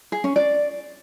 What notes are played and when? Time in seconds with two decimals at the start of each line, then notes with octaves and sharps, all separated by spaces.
0.12 G#4
0.24 C#4
0.36 D5